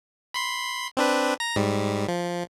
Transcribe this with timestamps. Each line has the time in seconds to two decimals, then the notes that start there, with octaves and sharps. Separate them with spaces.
0.34 B5 C6 C7
0.97 C4 D4 B4
1.40 A#5 A#6
1.56 G#2 G3
2.08 F3